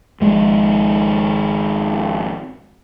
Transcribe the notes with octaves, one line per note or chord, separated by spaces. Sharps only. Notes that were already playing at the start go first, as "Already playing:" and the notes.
G#1 F3 G#3